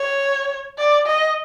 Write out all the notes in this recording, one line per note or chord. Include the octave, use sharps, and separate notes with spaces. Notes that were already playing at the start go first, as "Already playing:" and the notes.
Already playing: C#5
D5
D#5